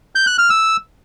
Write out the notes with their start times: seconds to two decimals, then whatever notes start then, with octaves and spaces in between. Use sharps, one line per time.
0.15 G6
0.27 F#6
0.38 F6
0.50 E6